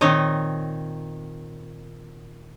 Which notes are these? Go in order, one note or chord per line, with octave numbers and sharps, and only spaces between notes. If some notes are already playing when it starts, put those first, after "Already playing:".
A#2 D#3 C4 C#5 D#5